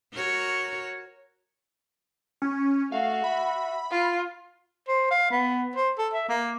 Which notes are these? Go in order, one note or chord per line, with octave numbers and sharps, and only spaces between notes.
F#4 A#4 C#5
C#4
A3 F#4 F5
E5 B5
F4
C5
F5
B3
C5
A4
E5
A#3